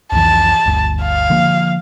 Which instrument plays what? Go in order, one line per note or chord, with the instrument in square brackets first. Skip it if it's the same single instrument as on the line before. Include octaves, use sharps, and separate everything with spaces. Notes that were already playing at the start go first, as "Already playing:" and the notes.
[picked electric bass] C2 F2 E3 [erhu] A5
[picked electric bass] G1 D2
[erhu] F5
[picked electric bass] D3 F3 A#3